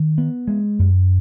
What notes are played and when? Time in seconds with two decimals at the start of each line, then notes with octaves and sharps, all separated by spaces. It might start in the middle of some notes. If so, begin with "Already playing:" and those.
Already playing: D#3
0.18 B3
0.48 G#3
0.79 F#2